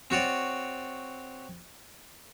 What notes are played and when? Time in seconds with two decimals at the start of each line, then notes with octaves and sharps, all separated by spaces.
0.10 C4 F#4 C#5 D5